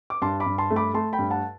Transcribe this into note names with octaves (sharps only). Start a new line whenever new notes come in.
D6
G2 A5 C6
B5 D6
G2
A5 C6
A3
B5 D6
A3 A5 C6
G5 B5
G2
F#5 A5